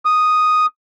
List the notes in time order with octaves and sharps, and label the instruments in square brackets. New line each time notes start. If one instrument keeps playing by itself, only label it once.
[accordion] D#6